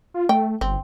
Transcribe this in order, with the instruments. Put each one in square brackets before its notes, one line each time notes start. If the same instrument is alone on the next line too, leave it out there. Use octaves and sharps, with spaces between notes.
[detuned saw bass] F4
[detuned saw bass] A3 [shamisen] G5
[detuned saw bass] G1 [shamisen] C4